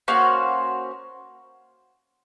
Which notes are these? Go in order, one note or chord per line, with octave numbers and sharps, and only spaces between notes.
A#3 C#4 F#4 C5